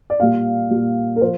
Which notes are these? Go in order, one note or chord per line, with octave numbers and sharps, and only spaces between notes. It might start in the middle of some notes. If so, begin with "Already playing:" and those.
D5
A#2 G3 F5
A#2 G3
A#4
F3 C5